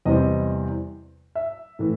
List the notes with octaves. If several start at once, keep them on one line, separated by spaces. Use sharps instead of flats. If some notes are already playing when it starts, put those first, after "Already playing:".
E2 C3 E3 G3 C4 D#5
E5
A2 E3